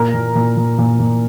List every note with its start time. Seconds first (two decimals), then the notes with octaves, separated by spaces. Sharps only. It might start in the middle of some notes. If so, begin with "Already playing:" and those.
Already playing: A#2 A#4
0.14 A#2
0.35 A#2
0.57 A#2
0.78 A#2
1.00 A#2